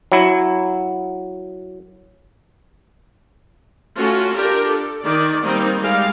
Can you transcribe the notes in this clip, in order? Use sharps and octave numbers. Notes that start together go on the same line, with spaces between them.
F#3 E4
A3 C#4 F4 F#4
D4 F4 G4 A#4
A4
D#3 D5
D#3 G3 A#3 C4 D#4
G3 G#3 F5